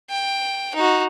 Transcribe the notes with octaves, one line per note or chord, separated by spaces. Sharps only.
G5
D#4 F#4